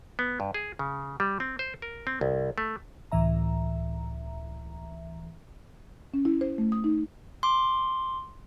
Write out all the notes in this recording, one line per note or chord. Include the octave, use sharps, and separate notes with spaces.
B3
G2
G#4
C#3
G3
C4
C5
A#4
C4
C2
A3
C#2 A2 E3 E5 A#5
C#4
E4
C5
A3
D#6
D#4
C6 D6